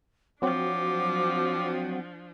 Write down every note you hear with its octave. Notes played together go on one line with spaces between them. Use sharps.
F3 F#3 C4 D4 F#4 D6